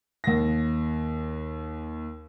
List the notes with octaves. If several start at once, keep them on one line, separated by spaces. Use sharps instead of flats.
D#2 A#6